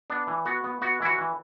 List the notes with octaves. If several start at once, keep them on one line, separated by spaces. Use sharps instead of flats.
B3 D4
E3
B3 F#4
B3
B3 F#4
E3 E4
F#4
E3